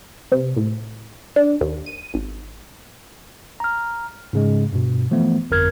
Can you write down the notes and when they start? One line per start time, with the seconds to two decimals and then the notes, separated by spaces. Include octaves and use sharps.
0.32 C3
0.57 A2
1.36 D4
1.61 D#2
1.86 D#7
2.14 G#1
3.60 A#5 F6
4.33 G#2 C#3 G#3
4.73 G2 B2
5.11 E3 F3 A3 B3
5.51 G1 F2 A#4 F6 G#6